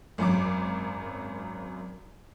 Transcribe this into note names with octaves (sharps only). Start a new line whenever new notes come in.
G#1 F#2 F#3 D6